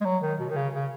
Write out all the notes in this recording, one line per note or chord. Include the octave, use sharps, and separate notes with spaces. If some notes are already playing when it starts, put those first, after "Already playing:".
G#3
F#3
D#3
B2
D#3
C#3
C#3